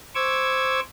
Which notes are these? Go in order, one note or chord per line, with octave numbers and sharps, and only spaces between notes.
C5 C#6 D6 E6 G#6